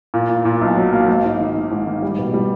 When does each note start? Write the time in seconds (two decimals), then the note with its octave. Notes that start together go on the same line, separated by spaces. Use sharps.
0.14 A#2
0.29 A#2
0.45 A#2
0.62 B1
0.76 F#3
0.93 A#3
1.08 G#1
1.24 G#2
1.39 D#3
1.55 D#3
1.71 G#2
1.87 D#3
2.02 G3
2.19 B2
2.34 G3